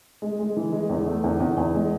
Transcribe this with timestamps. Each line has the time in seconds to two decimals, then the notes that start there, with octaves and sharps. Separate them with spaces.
0.22 G#3
0.40 G#3
0.57 E3
0.73 G#3
0.90 E2
1.06 A3
1.24 E2
1.40 E2
1.58 E2
1.75 G#3